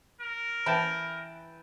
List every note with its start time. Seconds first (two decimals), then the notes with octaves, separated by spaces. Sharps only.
0.21 A#4
0.66 E3 B4 G5 A5